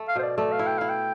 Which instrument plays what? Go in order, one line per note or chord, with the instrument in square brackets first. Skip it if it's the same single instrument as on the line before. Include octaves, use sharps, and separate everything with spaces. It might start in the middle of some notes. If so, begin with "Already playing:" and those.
Already playing: [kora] A3
[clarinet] F5
[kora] B2 [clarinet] C5
[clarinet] D5
[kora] A3 [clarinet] D5
[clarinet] F5
[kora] E4
[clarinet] G5
[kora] E4 [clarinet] F5
[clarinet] G5